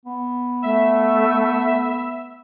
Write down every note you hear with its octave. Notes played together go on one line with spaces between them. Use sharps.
B3
A3 E5